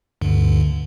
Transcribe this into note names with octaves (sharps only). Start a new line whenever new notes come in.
D2 G2 D3